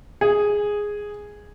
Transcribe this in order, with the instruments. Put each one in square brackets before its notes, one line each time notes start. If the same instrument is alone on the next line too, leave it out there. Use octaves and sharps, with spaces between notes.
[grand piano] G#4